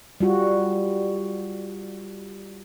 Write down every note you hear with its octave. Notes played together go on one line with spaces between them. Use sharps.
G3 F4 F#4